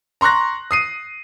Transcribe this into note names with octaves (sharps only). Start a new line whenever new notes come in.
A#5 C6 C#6 F#6 A#6
D#6 C7 D#7